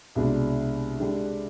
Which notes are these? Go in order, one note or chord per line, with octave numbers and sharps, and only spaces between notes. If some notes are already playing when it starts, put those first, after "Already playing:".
C2 B2 G#3 D4
D3 G#3 D4 G4